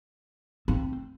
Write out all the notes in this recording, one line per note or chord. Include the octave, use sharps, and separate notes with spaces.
C4